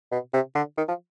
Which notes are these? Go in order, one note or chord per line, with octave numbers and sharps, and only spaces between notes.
B2
C3
D3
D#3
F3